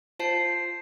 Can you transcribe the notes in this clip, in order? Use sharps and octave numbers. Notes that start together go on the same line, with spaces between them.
F4 C5 A5 C7